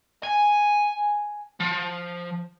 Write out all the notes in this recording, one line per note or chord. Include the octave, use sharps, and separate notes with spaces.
G#5
F3